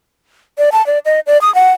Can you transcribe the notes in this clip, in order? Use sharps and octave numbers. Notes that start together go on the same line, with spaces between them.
D5
A5
D5
D#5
D5
D#6
F#5